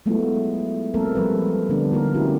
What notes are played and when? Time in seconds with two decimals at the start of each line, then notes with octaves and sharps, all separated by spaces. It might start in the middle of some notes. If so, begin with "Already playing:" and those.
0.06 F#3 G#3 A3 B3 E4 F4
0.94 F#3 G#3 A#3 C4 A4 A#4
1.15 F3 G3 B4
1.69 D3 G3 B3 D4
1.92 D3 A3 A#3 D#4 F4 A#4
2.14 A3 C#4 E4 F#4 G4